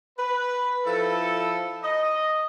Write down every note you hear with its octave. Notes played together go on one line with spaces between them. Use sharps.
B4
F3 E4 A4
D#5